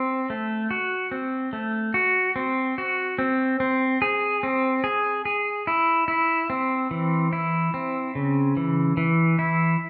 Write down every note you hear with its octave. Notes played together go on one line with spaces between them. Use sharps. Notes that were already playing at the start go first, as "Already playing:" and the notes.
Already playing: C4
A3
F#4
C4
A3
F#4
C4
F#4
C4
C4
G#4
C4
G#4
G#4
E4
E4
C4
E3
E4
C4
C#3
E3
E3
E4